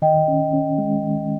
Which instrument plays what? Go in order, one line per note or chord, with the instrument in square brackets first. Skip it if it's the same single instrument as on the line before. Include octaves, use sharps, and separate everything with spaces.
[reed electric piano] D#3 [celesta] D#5 G5
[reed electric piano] C#4
C#4
G#3
D#3